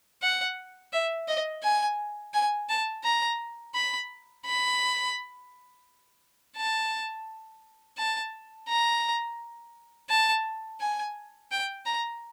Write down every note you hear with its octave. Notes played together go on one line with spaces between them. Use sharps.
F#5
E5
D#5
G#5
G#5
A5
A#5
B5
B5
A5
A5
A#5
A5
G#5
G5
A#5